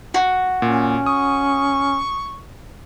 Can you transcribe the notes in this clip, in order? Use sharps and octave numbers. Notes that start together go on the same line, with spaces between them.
F#4
A#2 C#4
C#6 D#6